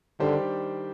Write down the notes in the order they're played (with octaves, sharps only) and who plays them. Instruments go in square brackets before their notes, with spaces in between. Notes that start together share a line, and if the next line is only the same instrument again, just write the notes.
[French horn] D3 [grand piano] D#3 G3 D4 G4 C5